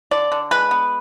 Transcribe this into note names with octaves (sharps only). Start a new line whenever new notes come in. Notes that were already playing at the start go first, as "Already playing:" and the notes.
D3 D5
D3
G#3 B4
B3